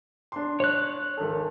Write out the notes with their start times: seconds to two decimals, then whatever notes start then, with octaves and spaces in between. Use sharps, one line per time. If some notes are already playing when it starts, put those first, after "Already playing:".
0.32 D4 C6
0.60 C#5 F#6
1.17 G#1 A4